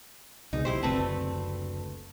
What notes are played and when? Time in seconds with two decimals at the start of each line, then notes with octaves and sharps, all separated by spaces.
0.53 C#2 B2 G#3 D#4
0.65 B1 E4 G4 C5
0.83 F#1 D2 D3 A3 C4 B4